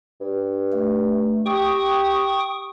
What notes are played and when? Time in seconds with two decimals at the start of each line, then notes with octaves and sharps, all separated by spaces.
0.21 G2
0.72 A3
1.46 G4 G5 C#6 D#6